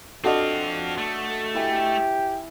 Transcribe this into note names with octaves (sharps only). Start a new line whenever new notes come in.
C4 D4 F4 F#4 A4 D#5
A3
E4 G4 G#5